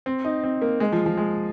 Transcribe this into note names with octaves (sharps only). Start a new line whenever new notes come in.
C4
D#4
C4
A#3
G#3
F3
F3
G#3